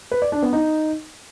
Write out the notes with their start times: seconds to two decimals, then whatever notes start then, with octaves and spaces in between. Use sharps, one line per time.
0.12 B4
0.22 D5
0.32 D4
0.43 B3
0.53 D#4